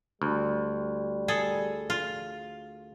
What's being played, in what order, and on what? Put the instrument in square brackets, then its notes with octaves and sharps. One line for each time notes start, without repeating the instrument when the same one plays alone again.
[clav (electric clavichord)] D2 [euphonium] G3
[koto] G#4 A4
F4